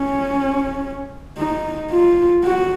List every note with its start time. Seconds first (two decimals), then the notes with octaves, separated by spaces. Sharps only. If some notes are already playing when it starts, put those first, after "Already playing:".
Already playing: C#4
1.38 D#4
1.91 F4
2.44 F#4